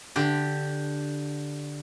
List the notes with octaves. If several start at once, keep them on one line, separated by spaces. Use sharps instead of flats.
D3 G4